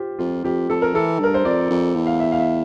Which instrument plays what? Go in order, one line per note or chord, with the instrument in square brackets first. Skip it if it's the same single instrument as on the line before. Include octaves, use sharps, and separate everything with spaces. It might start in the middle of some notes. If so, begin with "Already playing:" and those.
Already playing: [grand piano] F4 G4 C5
[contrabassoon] F2 [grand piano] F4
[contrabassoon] F2 [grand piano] G4
[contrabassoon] F2 [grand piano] A4
[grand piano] A#4
[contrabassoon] E3 [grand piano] A4
[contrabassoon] G2 [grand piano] A#4
[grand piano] C5
[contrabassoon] F2 [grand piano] D5
[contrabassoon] F2
E2
[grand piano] F5
E5
F5
E5